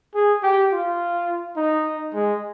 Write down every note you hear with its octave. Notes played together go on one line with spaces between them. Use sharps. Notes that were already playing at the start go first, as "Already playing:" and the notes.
G#4
G4
F4
D#4
G#3